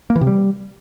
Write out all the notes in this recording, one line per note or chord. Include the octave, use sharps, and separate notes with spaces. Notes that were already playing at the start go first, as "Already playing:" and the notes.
A#3
E3
C3
G3